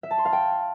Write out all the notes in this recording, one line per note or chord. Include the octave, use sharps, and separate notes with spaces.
E5
A5
C6
F5
G5